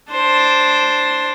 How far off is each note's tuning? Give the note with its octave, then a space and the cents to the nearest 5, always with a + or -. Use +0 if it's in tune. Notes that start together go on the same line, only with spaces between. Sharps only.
D4 +0 C5 +5